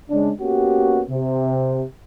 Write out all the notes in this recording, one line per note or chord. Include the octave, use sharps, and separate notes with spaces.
C#3 G#3 C#4 D4
A#3 B3 C#4 F#4 G4
C3